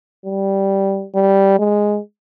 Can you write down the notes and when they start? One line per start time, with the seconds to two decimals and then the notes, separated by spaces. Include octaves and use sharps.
0.25 G3
1.15 G3
1.59 G#3